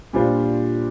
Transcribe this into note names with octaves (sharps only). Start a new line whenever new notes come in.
A#2 G3 D4 F4 C5